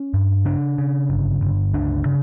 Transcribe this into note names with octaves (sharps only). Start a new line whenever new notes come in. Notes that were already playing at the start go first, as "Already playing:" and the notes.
Already playing: C#4
G2
C#3 D4
C#3
G1
G1
C#2 D4
C#3